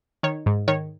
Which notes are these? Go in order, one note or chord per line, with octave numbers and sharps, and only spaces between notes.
D#3 C#5
G#2
D#3 C#5